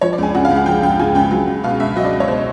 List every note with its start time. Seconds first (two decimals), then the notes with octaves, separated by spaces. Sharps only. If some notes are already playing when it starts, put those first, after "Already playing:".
0.01 F3 C#5
0.13 D5
0.18 C#2 G#5
0.35 C#3 F#5
0.45 F5
0.50 C#2
0.56 F#5
0.66 F3 G5
0.82 C#2 G5
1.00 C#3 G#5
1.15 C#2 G5
1.31 F#3
1.48 C#2
1.63 B2 F5
1.80 C#2 E5
1.96 F#3 D#5
2.05 D5
2.13 C#2
2.20 C#5
2.28 B2 C5